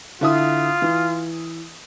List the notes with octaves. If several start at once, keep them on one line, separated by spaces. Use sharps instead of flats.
D3 E4 F4 D#6
E3